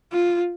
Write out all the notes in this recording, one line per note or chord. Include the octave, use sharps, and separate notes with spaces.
F4